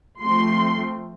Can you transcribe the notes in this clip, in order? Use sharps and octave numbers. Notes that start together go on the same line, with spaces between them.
F3 A3 C4 C6